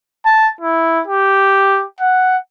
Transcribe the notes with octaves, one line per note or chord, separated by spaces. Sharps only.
A5
E4
G4
F#5